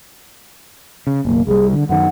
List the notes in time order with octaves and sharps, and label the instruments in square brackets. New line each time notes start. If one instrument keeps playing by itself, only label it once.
[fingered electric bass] C#3
[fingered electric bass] F#1 B1 [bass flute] A#3
[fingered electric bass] C2 G3 [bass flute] G#4
[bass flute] D3
[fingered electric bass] F#2 D#3 [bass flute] F#5